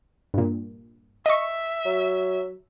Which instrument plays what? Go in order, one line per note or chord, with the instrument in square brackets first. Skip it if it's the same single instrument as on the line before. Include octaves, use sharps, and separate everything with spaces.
[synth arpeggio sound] G2 A#2
[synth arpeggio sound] D#5 C#6 [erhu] E5
[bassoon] F#3